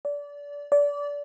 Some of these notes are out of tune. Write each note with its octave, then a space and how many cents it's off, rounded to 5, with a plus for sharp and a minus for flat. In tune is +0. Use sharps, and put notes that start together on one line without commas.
D5 -25
D5 -25